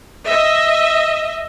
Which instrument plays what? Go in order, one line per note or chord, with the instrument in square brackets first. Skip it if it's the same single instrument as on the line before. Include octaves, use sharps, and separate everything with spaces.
[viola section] D#5 E5